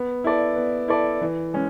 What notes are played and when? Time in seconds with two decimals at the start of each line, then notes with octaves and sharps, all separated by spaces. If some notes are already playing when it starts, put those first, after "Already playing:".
Already playing: B3
0.24 E4 A4 D5
0.56 B3
0.88 E4 A4 D5
1.21 E3
1.54 G#3 C#4